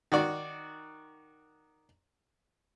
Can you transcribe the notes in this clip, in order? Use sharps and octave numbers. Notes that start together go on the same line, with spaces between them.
D#3 F#4 D5